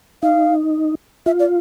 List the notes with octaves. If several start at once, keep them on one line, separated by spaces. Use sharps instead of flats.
D#4 F5
F4 E5
D5